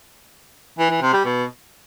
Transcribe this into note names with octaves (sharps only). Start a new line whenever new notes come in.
E3
E3
C3
G3
B2